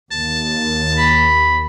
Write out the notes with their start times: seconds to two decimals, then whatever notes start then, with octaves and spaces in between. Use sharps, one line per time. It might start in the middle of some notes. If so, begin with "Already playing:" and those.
0.12 D#2 A5
0.97 B5